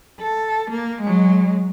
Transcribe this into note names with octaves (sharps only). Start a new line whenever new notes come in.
A4
A#3
F#3 G#3